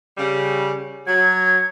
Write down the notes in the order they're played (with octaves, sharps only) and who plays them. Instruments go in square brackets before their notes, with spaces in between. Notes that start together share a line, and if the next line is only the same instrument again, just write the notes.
[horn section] C#3 G3
[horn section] F#3 [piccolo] G#6